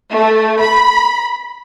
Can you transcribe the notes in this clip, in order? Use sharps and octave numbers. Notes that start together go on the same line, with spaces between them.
A3
B5